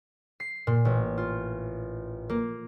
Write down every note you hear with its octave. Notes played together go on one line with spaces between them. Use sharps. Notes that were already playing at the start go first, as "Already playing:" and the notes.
C7
A#2
A1
F4
A#3